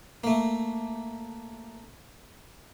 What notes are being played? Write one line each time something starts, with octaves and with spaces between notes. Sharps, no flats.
A3 A#3